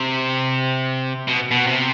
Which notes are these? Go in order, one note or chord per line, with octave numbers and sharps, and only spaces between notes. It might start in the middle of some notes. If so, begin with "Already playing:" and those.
Already playing: C3
B2
B2
C3